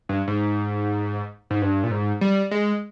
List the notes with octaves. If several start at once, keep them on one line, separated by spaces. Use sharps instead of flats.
G2
G#2
G#2
G2
A#2
G#2
G3
G#3